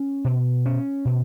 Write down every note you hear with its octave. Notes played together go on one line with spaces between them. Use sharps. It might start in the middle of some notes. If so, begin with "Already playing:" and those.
Already playing: C#4
B2
C#4
B2